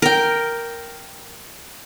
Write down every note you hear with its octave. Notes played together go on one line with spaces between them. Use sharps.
A#4 G5